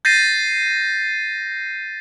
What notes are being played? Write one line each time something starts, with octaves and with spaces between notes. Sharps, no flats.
G6 A6 A#6 C7 D#7